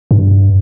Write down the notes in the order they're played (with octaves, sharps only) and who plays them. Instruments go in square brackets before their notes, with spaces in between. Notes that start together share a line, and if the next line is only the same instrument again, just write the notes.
[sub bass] G2